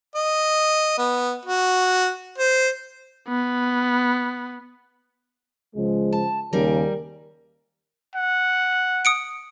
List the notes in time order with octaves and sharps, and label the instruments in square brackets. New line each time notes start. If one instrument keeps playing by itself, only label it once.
[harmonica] D#5
B3
F#4
C5
[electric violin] B3
[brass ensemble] C#2 F3 G#3
[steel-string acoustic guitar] A5
[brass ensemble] D#2 C#3 [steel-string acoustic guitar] G3 A#4
[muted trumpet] F#5
[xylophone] D#6 C#7 D7